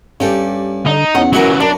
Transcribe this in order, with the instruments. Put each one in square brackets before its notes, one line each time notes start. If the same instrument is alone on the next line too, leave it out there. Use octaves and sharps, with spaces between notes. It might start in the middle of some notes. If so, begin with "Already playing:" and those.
[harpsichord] G2 A4 D5 [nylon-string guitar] C#4 G4
[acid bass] D3 [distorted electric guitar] D#4
[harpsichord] E2 [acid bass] C#4 [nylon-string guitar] F#5
[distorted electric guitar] E3 F#3 [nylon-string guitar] E4 F#4 A#4 [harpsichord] B4 F#5
[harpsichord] F#2 A#4 [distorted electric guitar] D4 [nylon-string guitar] B4